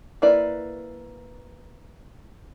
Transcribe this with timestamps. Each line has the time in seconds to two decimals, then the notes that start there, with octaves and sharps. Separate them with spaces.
0.22 A#3 E4 B4 D5